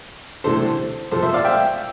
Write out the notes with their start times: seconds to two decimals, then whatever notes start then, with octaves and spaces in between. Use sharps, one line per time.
0.44 D2 C3 E3 A3 D4 A4 C5
1.11 F2 C3 F3 A4 C5
1.23 C5 E5
1.34 D5 F5
1.45 E5 G5